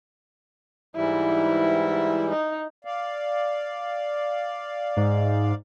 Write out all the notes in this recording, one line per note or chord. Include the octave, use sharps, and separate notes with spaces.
G#2 E3 G3 E4
D#4
D5 F5
G#2